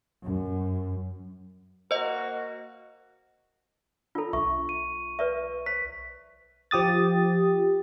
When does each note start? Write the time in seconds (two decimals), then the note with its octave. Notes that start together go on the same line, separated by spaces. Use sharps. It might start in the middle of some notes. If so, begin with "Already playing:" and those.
0.23 F#2
1.91 A#3 F#4 A#4 C5 D#5
4.15 D4 F4 A4 A#5
4.33 B1 E5 C#6
4.69 D#7
5.19 B4 D5 E5
5.66 C5 B6
6.71 F3 G4 D#6 A6